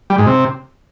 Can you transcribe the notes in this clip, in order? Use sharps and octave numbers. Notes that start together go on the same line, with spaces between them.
G3
G#2
C3